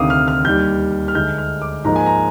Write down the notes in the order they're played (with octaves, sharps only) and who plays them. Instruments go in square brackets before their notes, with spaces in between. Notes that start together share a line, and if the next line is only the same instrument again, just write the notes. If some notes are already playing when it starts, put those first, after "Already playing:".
Already playing: [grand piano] D2 C3 D#3 F5 D6 D#6
F6
F6
D#2 D#3 G3 G6
F6
D2 D3 G#3 D#4 G6
F6
D6
G#2 F3 A#3 D#4 A#5
G#5
A#5